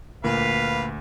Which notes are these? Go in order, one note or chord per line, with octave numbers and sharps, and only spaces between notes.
D2 A#2 B4 F5